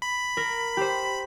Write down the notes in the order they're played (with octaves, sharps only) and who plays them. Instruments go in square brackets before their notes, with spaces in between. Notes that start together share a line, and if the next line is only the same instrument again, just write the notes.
[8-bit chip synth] B5
[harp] A#4
G4 C5